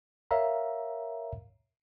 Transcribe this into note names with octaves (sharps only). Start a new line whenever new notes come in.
A#4 C#5 E5 F5 A#5